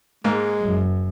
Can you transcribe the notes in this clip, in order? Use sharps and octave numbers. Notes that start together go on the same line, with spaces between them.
G#2 G#3 A#3
F#1 F#2